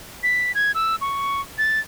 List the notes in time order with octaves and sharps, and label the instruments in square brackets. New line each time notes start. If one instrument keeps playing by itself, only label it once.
[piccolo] B6
G#6
E6
C#6
A6